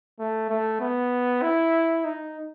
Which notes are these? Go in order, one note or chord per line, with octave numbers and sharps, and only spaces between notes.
A3
A3
B3
E4
D#4